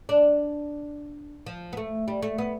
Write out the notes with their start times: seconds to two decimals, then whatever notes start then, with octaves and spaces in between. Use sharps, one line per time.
0.09 D4
1.46 F3
1.73 B3
1.77 A3
2.08 G3
2.22 A3
2.38 B3